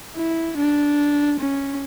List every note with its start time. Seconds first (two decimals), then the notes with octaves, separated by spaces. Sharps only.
0.16 E4
0.57 D4
1.39 C#4